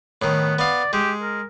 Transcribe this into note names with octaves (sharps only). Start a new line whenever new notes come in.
A2 D#3 B3
B3 D5 F5
G#3 G4
A#4